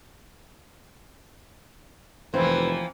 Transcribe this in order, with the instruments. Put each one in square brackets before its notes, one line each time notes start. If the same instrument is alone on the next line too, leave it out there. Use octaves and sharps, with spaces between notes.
[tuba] F1 [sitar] E3 F3 A#3 [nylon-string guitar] C4 [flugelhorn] B4